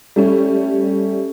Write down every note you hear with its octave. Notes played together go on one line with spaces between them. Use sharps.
G3 A3 C#4